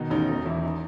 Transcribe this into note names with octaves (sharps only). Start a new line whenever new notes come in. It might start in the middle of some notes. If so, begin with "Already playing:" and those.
Already playing: B2 D#3 D#4
A1 D#4
E1 D#4
E2 E3 E4
D#4